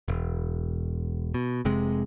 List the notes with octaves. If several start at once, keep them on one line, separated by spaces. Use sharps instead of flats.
E1
B2
F1 C3 G#3